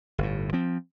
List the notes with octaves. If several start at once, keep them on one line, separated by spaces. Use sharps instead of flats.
G1 A2
F3 C4